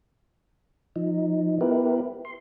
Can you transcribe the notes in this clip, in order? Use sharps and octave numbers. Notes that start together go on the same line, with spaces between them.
F3 D#4
B3 E4 G4 A#4 B4
C6